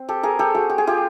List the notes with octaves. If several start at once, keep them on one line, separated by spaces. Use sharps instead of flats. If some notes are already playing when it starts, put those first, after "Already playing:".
Already playing: C4
G4 A4
G#4 A#4
G4 A4
F#4 G#4
G4
G#4
F4 G4